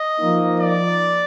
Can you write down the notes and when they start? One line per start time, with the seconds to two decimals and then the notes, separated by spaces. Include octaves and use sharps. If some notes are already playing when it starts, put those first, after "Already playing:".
Already playing: D#5
0.17 F3 A#3 D#4
0.60 D5